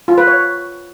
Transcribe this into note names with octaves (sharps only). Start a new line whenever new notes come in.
F4
B4
C#5